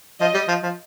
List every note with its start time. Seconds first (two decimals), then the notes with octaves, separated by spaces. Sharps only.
0.21 F3 D#5
0.34 G3
0.48 F3
0.63 F3